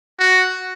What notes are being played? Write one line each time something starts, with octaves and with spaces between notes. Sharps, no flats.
F#4